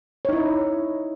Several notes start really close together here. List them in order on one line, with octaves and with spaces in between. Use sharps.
C#5 D#4 E4